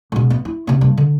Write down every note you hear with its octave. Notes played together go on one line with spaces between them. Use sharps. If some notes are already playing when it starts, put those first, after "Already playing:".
G#2 B2
B3
E4
C3 A#3
G2
D3